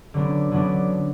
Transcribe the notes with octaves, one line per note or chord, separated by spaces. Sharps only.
D3 F#3 B3 D4
D3 F#3 B3 D4